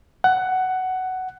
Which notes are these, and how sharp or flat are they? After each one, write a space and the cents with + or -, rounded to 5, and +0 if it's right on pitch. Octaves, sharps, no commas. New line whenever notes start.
F#5 +10